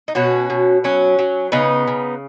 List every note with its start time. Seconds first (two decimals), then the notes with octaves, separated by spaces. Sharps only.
0.08 D#4
0.15 B2 C#4 F#4
0.50 B2
0.84 F#3 C#4
1.19 F#3
1.52 C#3 B3 D#4
1.87 C#3